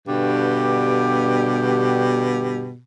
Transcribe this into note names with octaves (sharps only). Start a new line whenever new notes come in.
G2 B2 D3 G4